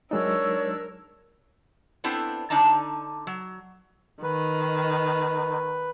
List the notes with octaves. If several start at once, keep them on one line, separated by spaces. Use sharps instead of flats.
F#3 G#3 D4 D#4 A#4 C#5 E6
B3 C4 D4 E4 A4 C5
D3 D4 D#4 D5 A5 A#5
F#3
D#3 B4